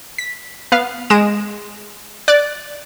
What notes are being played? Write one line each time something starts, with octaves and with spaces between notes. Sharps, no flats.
B6
B3 F5
G#3 D#6 D7 E7
D5 F#6 A6